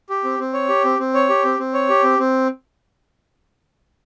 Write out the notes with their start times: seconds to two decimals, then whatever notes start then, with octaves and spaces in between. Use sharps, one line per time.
0.10 G4
0.24 C4
0.39 C4
0.54 C#5
0.69 G4
0.85 C4
0.99 C4
1.14 C#5
1.29 G4
1.44 C4
1.59 C4
1.74 C#5
1.89 G4
2.03 C4
2.19 C4